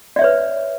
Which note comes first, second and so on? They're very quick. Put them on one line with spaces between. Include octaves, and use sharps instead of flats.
D5 E5 C#5 B4